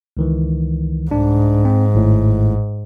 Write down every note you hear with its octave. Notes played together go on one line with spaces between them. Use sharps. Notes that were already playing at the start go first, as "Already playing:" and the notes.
C#2 D#3 E3
C2 G#2 D4
C4
G#1 A2